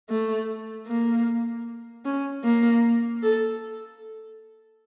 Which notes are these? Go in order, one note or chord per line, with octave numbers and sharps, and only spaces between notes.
A3
A#3
C#4
A#3
A4